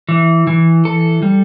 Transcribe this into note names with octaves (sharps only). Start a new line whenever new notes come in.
E3
E3
A4
G3